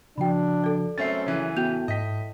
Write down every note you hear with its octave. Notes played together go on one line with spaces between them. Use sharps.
C#3 F3 D4 F#4 G5 B5
A4 D5
F#2 A3 C4 C#4 A6 C7
C#3 E3
A2 B3 F#4 G5 G6 F7
G#2 D#5 B6